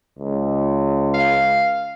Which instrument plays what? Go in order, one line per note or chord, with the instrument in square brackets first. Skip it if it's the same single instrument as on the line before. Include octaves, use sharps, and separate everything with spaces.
[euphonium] C#2
[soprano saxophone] F5